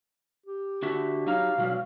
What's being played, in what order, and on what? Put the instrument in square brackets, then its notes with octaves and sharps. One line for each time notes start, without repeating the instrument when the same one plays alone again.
[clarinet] G4
[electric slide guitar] D3 F#4 E5
[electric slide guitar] F#3 D#4 A#5 [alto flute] F5
[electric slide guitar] B2 F#3 G3 [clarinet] F#4